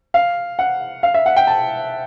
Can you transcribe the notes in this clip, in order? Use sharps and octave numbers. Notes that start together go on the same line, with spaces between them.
F5
F#5
F5
E5
F#5
G5
A5